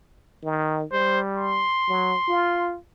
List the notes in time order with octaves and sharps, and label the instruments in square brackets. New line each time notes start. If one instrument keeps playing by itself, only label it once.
[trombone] D#3
[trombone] G3 [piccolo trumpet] C5
[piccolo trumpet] C6
[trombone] F#3
F4